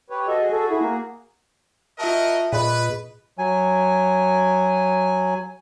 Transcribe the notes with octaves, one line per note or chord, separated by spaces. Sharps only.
G4 B4 C#5
F#4 A4 D#5 E5
F#4 G#4
A4
E4
A#3
F4 F#4 A#4 D#5 E5 A5
A#2 G#4 B4 D#5 B5
F#3 G#5